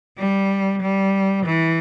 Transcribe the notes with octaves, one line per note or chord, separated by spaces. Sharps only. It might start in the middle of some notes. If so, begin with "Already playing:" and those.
G3
G3
E3